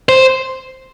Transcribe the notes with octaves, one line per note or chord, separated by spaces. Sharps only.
C5